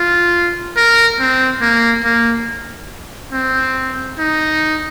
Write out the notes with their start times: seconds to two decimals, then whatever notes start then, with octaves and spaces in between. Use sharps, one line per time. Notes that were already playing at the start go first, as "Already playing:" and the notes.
Already playing: F4
0.77 A#4
1.20 C4
1.61 A#3
2.04 A#3
3.33 C4
4.19 D#4